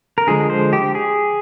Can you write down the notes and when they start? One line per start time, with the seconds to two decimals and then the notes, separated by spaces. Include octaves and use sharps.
0.18 A#4
0.27 D3 F3 G#3 G#4
0.50 C5
0.73 G4
0.95 G#4